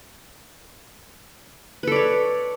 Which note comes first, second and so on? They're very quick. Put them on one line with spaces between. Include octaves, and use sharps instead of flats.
B4 A4 D5 C#5